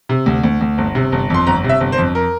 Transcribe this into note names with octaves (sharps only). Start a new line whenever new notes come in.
C3
D2
D2
D2
G1
C3
G1
F2 C6
G1 A#5
C3
E5
G1
C5
F2
A#4